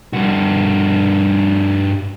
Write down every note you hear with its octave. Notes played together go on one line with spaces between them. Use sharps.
G2 F#4